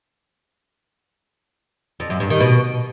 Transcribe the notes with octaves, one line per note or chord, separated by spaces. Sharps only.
F2
F#2
G2
D#3
B2